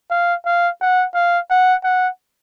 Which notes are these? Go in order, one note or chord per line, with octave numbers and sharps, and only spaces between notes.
F5
F5
F#5
F5
F#5
F#5